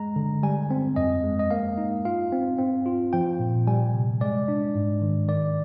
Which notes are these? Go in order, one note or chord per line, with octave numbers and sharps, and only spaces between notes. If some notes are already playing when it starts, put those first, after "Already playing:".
Already playing: G#3 A#5
D3
G3 G#5
C4
F2 D#5
G#3
D#5
A#3 F5
D#4
F4 F5
C4
C4
F4
F3 G5
A#2
G3 G#5
C3
G#3 D5
D4
G#2
D#3
D#3 D5